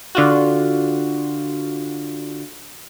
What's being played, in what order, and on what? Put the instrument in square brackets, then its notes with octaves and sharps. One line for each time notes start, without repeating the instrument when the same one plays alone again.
[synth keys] D3 F4 F#4